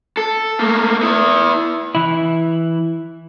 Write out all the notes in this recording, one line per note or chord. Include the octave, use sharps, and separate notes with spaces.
A4
A3 A#3
B3 E4
E3 E4